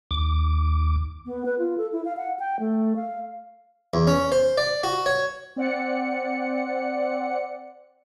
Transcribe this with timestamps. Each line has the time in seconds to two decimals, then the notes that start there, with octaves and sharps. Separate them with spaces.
0.11 D#2 D6
1.25 B3
1.46 B4
1.59 F4
1.78 A4
1.92 E4
2.05 F5
2.17 F#5
2.39 G5
2.60 A3
2.96 F5
3.94 E2
4.07 C#4
4.32 C5
4.58 D5
4.83 F#4
5.06 C#5
5.56 C4 D5 F#5 C#7